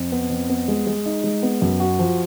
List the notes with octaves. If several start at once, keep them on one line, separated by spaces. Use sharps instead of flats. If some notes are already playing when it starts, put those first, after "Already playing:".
Already playing: F2
B3
F2
B3
G#3
G#3
D#4
G#3
B3
F#2
F#4
F3